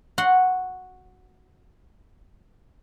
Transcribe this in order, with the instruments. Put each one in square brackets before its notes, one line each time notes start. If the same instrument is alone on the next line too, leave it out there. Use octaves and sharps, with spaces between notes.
[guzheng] F#4 F#5 C6